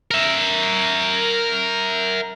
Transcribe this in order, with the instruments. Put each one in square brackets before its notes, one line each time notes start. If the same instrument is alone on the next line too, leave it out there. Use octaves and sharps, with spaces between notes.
[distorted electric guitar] A#4 E5